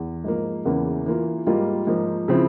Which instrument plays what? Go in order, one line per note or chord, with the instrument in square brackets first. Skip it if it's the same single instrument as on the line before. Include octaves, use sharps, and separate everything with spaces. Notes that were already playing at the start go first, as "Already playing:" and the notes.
Already playing: [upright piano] E2
G#2 F3 A#3
E2 C#3 E3 A#3 C#4
E3 A#3 F4
G#2 G3 A#3 F4
G#2 F3 A#3
C#3 F3 C4 E4